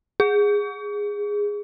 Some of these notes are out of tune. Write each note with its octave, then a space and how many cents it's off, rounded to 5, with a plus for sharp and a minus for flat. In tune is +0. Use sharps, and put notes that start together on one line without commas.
G#4 -10